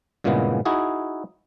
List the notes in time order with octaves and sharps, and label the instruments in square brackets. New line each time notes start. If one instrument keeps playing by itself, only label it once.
[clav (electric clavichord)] G2 A#2 C#3 E3 G#3 B3
D#4 E4 F#4 G#4